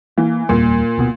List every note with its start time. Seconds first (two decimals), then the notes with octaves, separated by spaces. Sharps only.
0.18 E3 A#3
0.49 F1 D#2 A#2 G3
0.97 D1 B2 B3